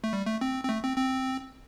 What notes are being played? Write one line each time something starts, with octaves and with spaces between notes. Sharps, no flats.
A3
G3
A3
C4
C4
A3
C4
C4